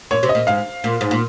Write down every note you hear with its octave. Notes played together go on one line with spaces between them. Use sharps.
A#2 C#5
C3
D#5
A#2
G#2 F5
A#2
G#2
A#2